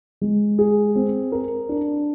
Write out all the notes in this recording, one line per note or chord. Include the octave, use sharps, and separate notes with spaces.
G#3
G#4
C4
A#4
D4